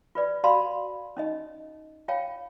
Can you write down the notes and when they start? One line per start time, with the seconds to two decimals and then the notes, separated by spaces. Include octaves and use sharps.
0.15 F4 B4 D5
0.44 F#4 D5 F5 A5 B5 C6
1.17 C#4 D#4 D#5
2.08 F4 C#5 F5 G5 A5